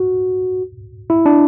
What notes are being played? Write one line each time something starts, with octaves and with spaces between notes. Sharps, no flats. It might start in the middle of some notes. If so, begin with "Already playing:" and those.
Already playing: F#4
E4
D4